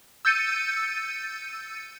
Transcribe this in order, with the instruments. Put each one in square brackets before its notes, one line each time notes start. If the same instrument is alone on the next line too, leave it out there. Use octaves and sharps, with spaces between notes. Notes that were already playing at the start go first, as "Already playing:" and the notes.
[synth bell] E6 G6 A6 C#7 D#7